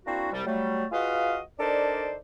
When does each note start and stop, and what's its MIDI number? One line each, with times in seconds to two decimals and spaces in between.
0.05 0.28 58
0.05 0.28 60
0.05 0.28 62
0.05 0.28 64
0.05 0.28 66
0.32 0.42 36
0.32 0.42 55
0.46 0.85 54
0.46 0.85 55
0.46 0.85 57
0.92 1.39 65
0.92 1.39 66
0.92 1.39 68
0.92 1.39 71
0.92 1.39 75
0.92 1.39 77
1.59 2.16 62
1.59 2.16 63
1.59 2.16 69
1.59 2.16 70
1.59 2.16 72
1.59 2.16 74